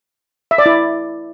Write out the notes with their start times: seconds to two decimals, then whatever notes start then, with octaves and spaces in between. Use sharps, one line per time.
0.51 E5
0.58 D5
0.66 E4